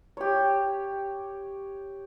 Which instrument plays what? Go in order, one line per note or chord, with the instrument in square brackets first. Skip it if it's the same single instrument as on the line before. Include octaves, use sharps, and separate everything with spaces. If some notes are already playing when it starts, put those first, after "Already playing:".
[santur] G4 C#5